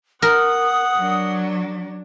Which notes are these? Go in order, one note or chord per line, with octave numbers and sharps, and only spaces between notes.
A#4 F#5 D#6
F#3 D4